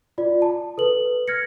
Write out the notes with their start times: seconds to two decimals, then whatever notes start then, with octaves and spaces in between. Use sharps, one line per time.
0.18 F4 D5
0.42 A5
0.78 A4 B4 F#7
1.28 F6 G#6 A#6 C#7